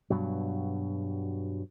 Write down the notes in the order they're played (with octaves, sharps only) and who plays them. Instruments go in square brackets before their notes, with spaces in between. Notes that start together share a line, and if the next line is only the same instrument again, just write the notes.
[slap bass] G2 B2 F#3